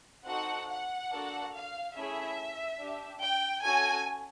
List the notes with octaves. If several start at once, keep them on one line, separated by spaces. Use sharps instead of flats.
C4 D#4 F#4 A4 F#5
F#5
A#3 D4 F#4 A4
F5
A3 C#4 E4 G#4 E5
D4 G4
G5
C#4 F#4 A4 G#5